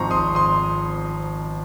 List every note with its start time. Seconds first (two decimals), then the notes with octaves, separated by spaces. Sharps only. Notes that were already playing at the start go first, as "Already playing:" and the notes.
Already playing: G#1 G#2 F3 C4 A#5 C6 C#6
0.11 C6 D#6
0.35 C6 D#6